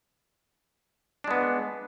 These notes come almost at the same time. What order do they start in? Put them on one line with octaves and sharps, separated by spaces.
D4 G#3 B3